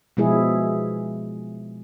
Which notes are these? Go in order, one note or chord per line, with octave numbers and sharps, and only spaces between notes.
B2 F3 G#3 E4 G#4